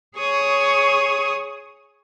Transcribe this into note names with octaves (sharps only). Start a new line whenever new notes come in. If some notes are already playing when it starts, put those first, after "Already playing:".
G#4 C#5 C#6 D#6